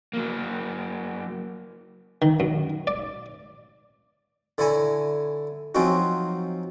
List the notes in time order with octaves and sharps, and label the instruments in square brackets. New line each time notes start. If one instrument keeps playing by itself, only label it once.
[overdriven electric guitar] F#3 A#3
[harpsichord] D#3
F#2
D5
D3 E4 C#5 G#5 A#5
F3 F#3 C4 C#4 D#4 F#4